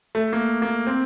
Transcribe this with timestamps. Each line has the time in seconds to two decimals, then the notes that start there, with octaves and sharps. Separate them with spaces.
0.15 A3
0.33 A#3
0.62 A#3
0.87 C4